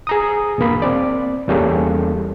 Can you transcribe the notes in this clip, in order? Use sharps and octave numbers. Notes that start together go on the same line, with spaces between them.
G#4 A#5 D#6
E2 G2 B2 A#3 B5
C4 D5
E2 G3 A#3 C#4 G#4 A4